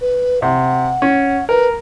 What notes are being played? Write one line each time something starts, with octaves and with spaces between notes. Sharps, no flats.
B4
C3 F#5
C#4
A#4 B4